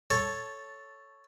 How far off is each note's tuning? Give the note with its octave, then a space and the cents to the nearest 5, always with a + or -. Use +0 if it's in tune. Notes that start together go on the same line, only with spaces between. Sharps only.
A4 +0 C#5 +0 A5 -10